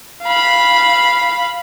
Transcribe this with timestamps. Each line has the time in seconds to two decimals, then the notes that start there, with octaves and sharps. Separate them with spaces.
0.23 F5 B5